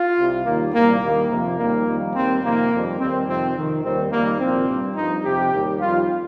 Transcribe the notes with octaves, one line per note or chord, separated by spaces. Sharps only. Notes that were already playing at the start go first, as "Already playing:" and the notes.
Already playing: F4
C2 C3 G3
D#2 D#3 G3 A#3
C2 A#2 G3 A#3
D#2 D#3 G3 A#3
F2 C3 F3
D#2 D#3 G3 A#3
F2 D#3 G3
D#2 D#3 G3 C4
F2 C3 D#3 A#3
F2 D#3 G3
D#2 D#3 G3 C4
F2 C3 D#3 C4
F2 C3 D#3
D#2 D#3 G3 C4
F2 D#3 G3 A#3
C2 A#2 F3 C4
G2 G3
G2 F3 D#4
F2 C3 F3 G4
D#2 D#3 G3
F2 D#3 G3 F4